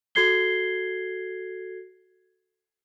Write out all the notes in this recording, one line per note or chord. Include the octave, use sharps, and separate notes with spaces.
F#4 A4 G#6 C7 G7